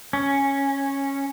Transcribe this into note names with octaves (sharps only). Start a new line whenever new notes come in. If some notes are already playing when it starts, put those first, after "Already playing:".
C#4